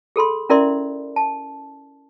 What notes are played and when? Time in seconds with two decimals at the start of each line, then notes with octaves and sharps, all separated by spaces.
0.16 G#4 A4 B5 C6
0.49 C#4 E4 A#4 D5 E5 C6
1.16 A5